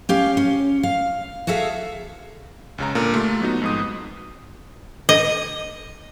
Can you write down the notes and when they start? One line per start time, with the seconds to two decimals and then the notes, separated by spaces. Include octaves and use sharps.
0.09 C#4 G4 F5
0.37 C#4
0.83 F5
1.47 F#4 G#4 A4 E5 F5
2.78 C#2 C#3 A#5
2.95 A#2 D3 A#3 A#4
3.14 A3 F4 G4
3.41 F#3 B3 D#4 F#4
3.62 F2 G#2 D#6
5.09 D#5